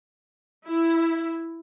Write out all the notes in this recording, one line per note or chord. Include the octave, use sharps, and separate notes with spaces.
E4